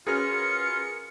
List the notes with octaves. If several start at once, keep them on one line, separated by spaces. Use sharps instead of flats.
C#4 F4 F#4 G#4 A#4 B4 F6 C#7